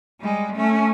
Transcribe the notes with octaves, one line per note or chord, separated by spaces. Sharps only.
G3 G#3
A3 C#4